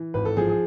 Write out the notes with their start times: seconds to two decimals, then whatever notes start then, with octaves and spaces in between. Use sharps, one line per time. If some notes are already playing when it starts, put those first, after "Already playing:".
Already playing: E3
0.14 G#1 B4
0.25 A4
0.36 F3 G#4
0.49 G#4